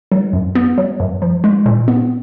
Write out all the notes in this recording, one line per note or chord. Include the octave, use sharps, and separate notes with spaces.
F#3
F#2
B3
F#3
F#2
F3
G#3
A#2
B3